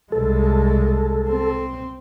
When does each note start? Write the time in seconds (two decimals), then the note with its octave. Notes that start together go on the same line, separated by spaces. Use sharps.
0.12 C2 G#3 A4
1.28 C4